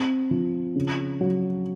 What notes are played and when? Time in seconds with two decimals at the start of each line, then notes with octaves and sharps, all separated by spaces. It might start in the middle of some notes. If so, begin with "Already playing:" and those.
Already playing: C4
0.31 F3
0.76 C#3
1.21 F#3